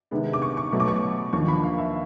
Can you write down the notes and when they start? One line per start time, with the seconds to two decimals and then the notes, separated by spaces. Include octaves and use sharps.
0.11 C3 D#3 G#3 B3 D4
0.33 D6
0.42 C#6
0.57 C#6
0.72 B2 F#3 A3
0.80 D6
0.88 C#6
0.96 D6
1.33 D#2 D3 F3 A#3 C#6
1.48 B5
1.63 F5
1.78 E5